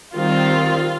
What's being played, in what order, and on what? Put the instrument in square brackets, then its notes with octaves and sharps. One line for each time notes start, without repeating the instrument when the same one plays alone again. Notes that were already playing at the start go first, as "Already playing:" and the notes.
[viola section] D#3 G3 C4 F4